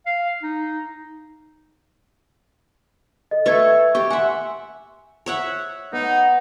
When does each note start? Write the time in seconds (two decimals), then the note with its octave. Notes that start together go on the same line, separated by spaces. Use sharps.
0.06 F5
0.43 D#4
3.31 A4 D#5
3.46 A3 A4 B4 C#6 G#6
3.95 G4 G5 C#6
4.10 E5 F#5 G#5 C6
5.26 C#5 E5 F#5
5.93 B3 D#4